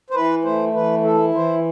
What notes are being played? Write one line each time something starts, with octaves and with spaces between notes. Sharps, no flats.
C5
E3 B4
A3 C5
E3 B4
E4 A4
E3 C5